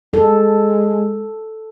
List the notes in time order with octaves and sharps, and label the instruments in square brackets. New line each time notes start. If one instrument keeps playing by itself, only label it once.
[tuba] G#3 [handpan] A4